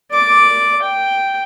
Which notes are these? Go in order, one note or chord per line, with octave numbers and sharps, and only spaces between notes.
D5 D6
G5